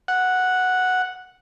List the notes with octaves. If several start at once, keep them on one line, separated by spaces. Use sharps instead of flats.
F#5